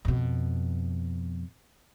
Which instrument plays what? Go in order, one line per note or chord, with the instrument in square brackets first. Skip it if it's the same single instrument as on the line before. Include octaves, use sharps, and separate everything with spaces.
[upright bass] F2 B2